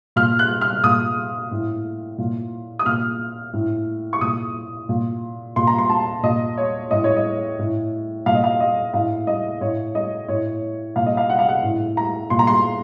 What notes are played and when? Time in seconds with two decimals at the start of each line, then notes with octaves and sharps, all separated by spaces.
0.16 A#2 F6
0.39 F#6
0.61 F6
0.84 A#2 D#6
1.51 A2
2.18 A#2
2.79 D#6
2.86 A#2 F6
3.53 A2
4.13 C#6
4.21 A#2 D#6
4.89 A#2
5.56 A#2 C6
5.67 A#5
5.78 C6
5.89 A5
6.23 A#2 D#5
6.57 C#5
6.91 A2 D#5
7.04 C#5
7.17 D#5
7.59 A2
8.26 A#2 F5
8.35 D#5
8.44 F5
8.60 D#5
8.93 A2 F5
9.27 D#5
9.61 A2 C#5
9.95 D#5
10.28 A2 C#5
10.96 A#2 F5
11.06 D#5
11.17 F5
11.30 F#5
11.39 F5
11.48 F#5
11.63 A2
11.97 A#5
12.30 A#2 C6
12.39 A#5
12.47 C6